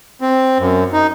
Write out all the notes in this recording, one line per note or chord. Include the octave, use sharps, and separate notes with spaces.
C4
F#2
D#4